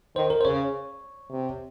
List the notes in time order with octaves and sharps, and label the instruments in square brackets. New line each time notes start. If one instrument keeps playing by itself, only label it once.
[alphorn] D#3 [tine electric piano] C5
[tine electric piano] A#4
C5
[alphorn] C#3 [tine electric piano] C#5
[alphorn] C3